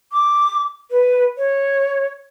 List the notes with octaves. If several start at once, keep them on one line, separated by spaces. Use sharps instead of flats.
D6
B4
C#5